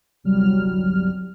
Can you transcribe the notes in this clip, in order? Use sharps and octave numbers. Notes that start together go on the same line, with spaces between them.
G1 C2 F#3 G3 F6